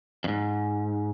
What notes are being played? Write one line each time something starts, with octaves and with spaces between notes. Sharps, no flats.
F2 G#2